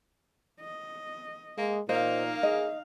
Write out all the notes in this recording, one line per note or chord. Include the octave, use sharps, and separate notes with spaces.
D#5
G#3 A#3
A#2 A#3 D#4 C5 D#5 F5
G#4 D#5